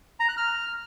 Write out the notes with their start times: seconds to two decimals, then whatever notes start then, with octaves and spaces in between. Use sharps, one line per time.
0.20 A#5
0.29 F#6
0.37 F6